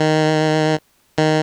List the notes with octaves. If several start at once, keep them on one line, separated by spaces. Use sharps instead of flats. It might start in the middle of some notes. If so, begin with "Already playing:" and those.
Already playing: D#3
D#3